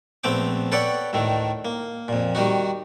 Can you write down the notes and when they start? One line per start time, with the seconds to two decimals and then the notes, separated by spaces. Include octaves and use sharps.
0.24 A#1 A3 B3 C4 G5 D6
0.72 A4 B4 C#5 D5 F#5 G5
1.13 D2 A2 D#3 A3
1.65 A#3
2.08 F2 A#2
2.35 D#3 G3 D#4 F#4